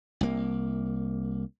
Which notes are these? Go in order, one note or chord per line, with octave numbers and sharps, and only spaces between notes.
C2 A#3